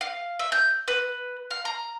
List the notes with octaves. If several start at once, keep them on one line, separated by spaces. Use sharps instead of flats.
F5
E5
G6
B4
F5
A#5